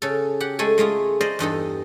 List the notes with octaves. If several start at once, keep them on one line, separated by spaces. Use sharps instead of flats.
C#3 A4
G4 F#5
G#3 A3 A4 G#5
G#3 A3 F4 G#4
A#4 C5 D5 D#5
E2 G2 D#4 A4